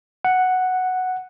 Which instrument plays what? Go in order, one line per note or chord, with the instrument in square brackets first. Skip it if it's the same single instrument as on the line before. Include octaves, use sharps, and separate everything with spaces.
[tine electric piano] F#5